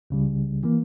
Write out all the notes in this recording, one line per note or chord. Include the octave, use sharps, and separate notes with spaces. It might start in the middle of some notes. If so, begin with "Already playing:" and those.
C#2 C#3 G3
E3 A#3